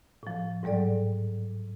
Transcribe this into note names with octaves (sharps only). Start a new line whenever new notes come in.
A2 F3
G#2 F#3 G3 A4 D5